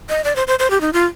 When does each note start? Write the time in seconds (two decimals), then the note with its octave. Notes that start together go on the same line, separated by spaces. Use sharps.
0.09 D#5
0.24 D5
0.36 C5
0.48 C5
0.59 C5
0.70 G4
0.81 D#4
0.93 F4